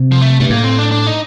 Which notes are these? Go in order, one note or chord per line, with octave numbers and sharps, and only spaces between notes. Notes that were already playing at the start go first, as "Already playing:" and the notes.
Already playing: C3
F3
A3
G2 A3
A2 A#3
C4
D4
D4
D#4